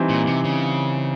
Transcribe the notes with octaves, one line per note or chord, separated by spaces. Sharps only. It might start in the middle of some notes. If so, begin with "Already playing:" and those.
Already playing: E3 G3 C4 D#4
A#2
C3
C#3